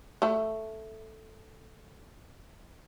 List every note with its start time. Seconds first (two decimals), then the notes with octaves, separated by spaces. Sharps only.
0.22 A3 A4